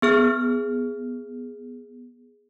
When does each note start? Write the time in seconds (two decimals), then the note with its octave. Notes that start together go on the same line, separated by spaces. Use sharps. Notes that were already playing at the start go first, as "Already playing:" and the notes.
0.02 B3 G#4 F6